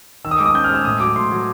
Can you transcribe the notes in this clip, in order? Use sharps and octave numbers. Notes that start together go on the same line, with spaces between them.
D#3 E6
D#6
G#3 D6
D#6
C#4 G6
F6
G#3 E6
A2 D#6
F#3 D6
A2 C6
F#3